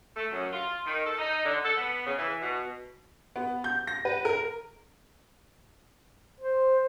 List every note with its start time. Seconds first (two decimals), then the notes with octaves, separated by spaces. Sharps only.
0.16 A3
0.31 F#2
0.53 F4
0.85 D#3
1.04 A4
1.19 D#4
1.45 D3
1.64 A4
1.76 B3
2.06 C#3
2.18 E3
2.41 B2
3.36 B3
3.64 G6
3.87 A#6
4.05 B4
4.25 A#4
6.40 C5